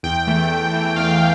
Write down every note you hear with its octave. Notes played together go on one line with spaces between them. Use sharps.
E2 G5
E3 A3
E2
E3 A3
E2 F5
E3